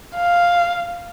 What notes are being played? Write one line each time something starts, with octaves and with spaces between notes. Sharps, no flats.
F5